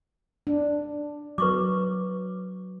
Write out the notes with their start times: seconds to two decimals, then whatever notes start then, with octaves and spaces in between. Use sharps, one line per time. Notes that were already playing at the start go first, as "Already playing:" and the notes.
0.47 D4
1.38 F#3 B4 C#6 D6